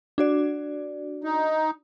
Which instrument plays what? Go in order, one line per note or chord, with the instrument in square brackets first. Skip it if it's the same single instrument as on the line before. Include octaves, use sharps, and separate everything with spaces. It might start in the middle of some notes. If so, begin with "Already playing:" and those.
[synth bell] D4 F#4 D5
[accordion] D#4